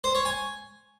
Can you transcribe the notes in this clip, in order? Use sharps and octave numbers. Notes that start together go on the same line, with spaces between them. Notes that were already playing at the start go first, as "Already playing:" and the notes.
C5
C#5
G#5